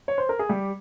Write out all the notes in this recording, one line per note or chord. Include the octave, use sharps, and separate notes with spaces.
C#5
C5
A#4
G#4
G3 G4